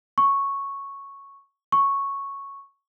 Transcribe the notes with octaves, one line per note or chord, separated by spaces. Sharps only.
C#6
C#6